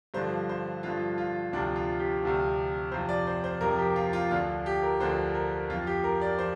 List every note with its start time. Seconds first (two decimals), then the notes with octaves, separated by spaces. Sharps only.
0.14 G2 D3 F3 C5
0.49 C5
0.83 G2 D3 F3 F4
1.18 F4
1.53 D2 C3 F3 D4
1.76 F4
2.00 G4
2.22 D2 C3 F3
2.92 F2 C3 F3 C5
3.09 D5
3.27 C5
3.44 C5
3.61 F2 C3 F3 A#4
3.78 G4
3.96 F4
4.13 F4
4.31 D2 D3 F3 F4
4.66 G4
4.83 A#4
5.00 D2 D3 F3 C5
5.34 A#4
5.70 F2 F4
5.74 F3
5.87 G4
6.04 A#4
6.21 D5
6.39 F3 C5